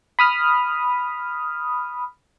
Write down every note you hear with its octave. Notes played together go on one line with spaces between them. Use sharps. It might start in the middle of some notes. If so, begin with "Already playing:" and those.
B5 D#6 F6